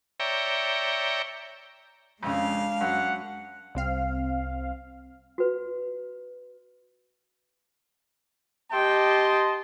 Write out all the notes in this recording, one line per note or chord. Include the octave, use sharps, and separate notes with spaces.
C#5 D5 E5 G5 A#5
F2 C#3 G#3 D4 F5
F#2 F#5
C2 C4 F5
F#4 B4
G4 D#5 G5 A5 C6